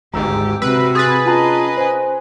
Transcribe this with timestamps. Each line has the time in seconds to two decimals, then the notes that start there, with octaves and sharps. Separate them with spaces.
0.14 G#1 D2 G#2 G4 A#5 E6
0.62 C3 F#4 B4 E6
0.95 G#4 B4 C6 D#6 A6
1.26 C#4 F4 D#5 A5 A#5
1.77 C5 G#5